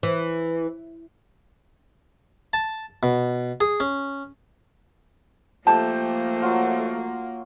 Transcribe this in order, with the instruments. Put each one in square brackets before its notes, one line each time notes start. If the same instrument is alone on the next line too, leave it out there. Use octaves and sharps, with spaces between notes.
[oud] E3
[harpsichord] A5
B2
G#4
C#4
[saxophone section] F3 A3 [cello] A#3 [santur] G4 [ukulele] A5
[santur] F#3 F4